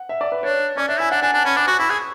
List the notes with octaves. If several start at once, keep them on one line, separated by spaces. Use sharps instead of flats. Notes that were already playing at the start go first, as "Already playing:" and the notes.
Already playing: F#5
E5
D5
B4
D4 C#5
C#4 D5
D4 E5
E4 G#5
D4 F#5
D4 G#5
D4 A5
C#4 B5
D4 D6
F#4 C#6
E4 B5
G#4 C#6